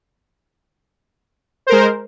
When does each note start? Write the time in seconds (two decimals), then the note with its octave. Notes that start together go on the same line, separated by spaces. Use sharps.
1.67 C5
1.69 A#4
1.72 G#3